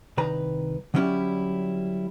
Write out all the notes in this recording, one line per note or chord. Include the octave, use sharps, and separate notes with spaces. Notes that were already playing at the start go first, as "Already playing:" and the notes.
C2 D#3 B4 A#5
D3 F#3 G3 C#4 E4 G4